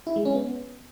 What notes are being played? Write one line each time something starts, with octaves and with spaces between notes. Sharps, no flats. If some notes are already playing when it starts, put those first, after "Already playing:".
E4
G#3
C#4
B3